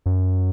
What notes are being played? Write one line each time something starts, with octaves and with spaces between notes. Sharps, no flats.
F#2